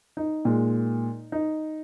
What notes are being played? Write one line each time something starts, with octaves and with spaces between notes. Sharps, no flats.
D#4
A#2 G#3
D#4